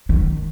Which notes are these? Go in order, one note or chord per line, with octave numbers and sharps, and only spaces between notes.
D#3